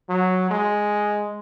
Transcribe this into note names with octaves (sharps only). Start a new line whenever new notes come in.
F#3
G#3